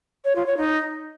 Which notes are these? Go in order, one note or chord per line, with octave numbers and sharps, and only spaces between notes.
C#5
F4
C#5
D#4